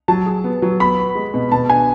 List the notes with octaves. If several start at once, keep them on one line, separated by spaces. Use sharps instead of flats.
F#3 A5
G#4
B3
F#3
B3 B5
F#4
G#3
B2
B2 A5
D4 G#5